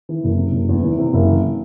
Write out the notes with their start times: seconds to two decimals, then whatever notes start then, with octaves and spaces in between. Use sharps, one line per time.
0.09 E3
0.24 F#1
0.38 C3
0.53 F#1
0.69 E2
0.83 E3
0.98 C3
1.13 F#1
1.28 E3